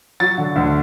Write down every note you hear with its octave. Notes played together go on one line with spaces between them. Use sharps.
F#3 A6
D3
D2